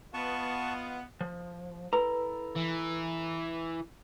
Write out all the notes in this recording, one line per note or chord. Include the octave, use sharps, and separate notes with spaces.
B3 F4 D#5 F#5 A5 C#6
F3
E4 A4 B4 A#5
E3